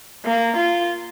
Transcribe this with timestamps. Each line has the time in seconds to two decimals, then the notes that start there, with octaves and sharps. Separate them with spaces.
0.25 A#3
0.56 F4